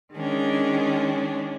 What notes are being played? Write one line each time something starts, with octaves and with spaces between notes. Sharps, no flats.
D#3 G#3 C#4 D4